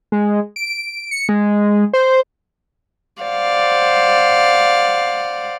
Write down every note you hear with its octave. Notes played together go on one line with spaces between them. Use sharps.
G#3
D7
C#7
G#3
C5
C5 D5 F5 F#5